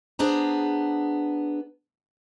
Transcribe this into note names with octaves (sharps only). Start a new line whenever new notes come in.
B3 D4 G#4 C5 A#5